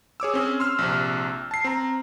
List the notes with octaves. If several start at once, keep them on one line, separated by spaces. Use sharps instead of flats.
G#4 C#5 D6 E6
C4 C#4 G#4
C6 E6 F6
A#1 C3
A5 C7
C4 A#5